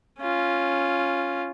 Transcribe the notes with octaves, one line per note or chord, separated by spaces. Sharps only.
C#4 F4